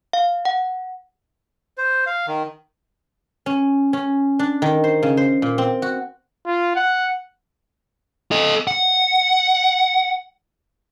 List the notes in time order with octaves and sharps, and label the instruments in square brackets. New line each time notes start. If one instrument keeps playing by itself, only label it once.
[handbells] F5
F#5
[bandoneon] C5
F5
D#3
[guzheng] C#4
C#4
D4
D#3
C5
C#3
C5
A#2
C4
F#4
[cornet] F4
F#5
[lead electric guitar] A4 D#5
F#5